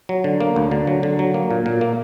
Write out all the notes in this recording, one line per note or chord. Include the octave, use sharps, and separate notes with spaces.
F#3
D3
A#3
D2
D3
F#3
D3
F#3
A#3
A#2
A#2
A#3